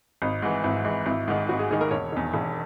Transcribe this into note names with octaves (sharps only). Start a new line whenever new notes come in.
G#1 D#4
G#2 E3
G#1 E4
G#2 E3
G#1 E4
G#2 D#3
G#1 F#4
G#4
G#2 D#3 G#4
A#4
E1 C#5
E2 D#3
E1